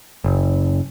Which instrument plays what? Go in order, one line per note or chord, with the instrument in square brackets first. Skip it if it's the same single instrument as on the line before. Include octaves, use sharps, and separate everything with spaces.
[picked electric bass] F#1